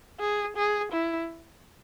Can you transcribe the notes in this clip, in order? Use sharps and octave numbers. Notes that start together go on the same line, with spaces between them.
G#4
G#4
E4